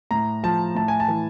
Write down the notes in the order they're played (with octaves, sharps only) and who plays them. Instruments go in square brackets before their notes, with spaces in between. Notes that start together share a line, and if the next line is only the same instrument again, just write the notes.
[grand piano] A2 A#5
F3 A5
A2 A5
G#5
A5
E3